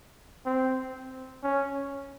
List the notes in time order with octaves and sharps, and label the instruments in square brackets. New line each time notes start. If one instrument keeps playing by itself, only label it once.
[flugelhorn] C4
C#4